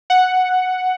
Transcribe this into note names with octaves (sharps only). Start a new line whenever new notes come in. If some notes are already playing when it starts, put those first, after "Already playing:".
F#5